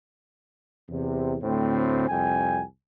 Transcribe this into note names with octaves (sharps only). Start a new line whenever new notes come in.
E2 C3
D2 A2 C4
C2 F2 G5 G#5